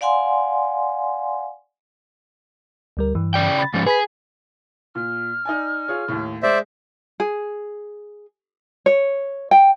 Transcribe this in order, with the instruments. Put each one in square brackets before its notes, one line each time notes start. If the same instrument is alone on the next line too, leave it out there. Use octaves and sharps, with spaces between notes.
[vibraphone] D5 F5 F#5 G#5 C6
[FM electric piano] D2 G3 A#4
G2 E3
[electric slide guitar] C#3 D5 G5
[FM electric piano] B5 A6
[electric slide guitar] G#2 F3 C#4
[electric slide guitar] G#4 [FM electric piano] B4 B5 B6
[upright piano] A#2 [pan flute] F6
[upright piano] D#4 D5 G#5
F4 G#4 C#5
D#2 A2
[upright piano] G#3 [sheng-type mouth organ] C5 D5 E5
[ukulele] G#4
C#5
G5